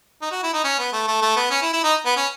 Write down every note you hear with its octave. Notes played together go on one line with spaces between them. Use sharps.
D#4
F#4
E4
D#4
C#4
B3
A3
A3
A3
B3
C#4
E4
E4
D#4
B3
C#4